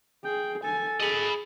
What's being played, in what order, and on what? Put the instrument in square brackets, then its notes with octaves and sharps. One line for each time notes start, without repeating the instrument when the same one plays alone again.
[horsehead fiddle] G#4 [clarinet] G5
[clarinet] A4 [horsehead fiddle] G#5
[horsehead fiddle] G#4 [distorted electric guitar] D#5 B5